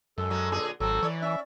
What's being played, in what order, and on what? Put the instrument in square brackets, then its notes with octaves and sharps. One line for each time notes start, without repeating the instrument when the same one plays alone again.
[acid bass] F#2 [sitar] G#3 [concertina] A4
[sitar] F#3 G#3 C#4
A#2 D3 G#4
[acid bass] G#1 [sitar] F#3 C4 [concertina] A4
[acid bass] E3 [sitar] C#5 D5
[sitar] C#4 [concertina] E5